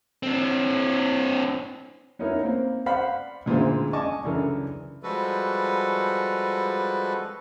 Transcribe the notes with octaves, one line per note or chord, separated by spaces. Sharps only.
C4 D4
B3 C#4 D#4 E4 A#4
A#3 C4
C5 D5 F5 F#5 B5
D2 A#2 E3 G#3 C5
D5 D#5 G#5 A5 C#6 D6
C#2 F#2 E3 D4 A4 A#4
F3 G3 G#3 F#4 A4 B4